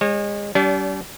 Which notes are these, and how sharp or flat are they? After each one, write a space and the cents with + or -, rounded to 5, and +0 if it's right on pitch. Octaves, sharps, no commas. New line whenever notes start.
G#3 -30 C#5 -40
G3 -30 D4 -45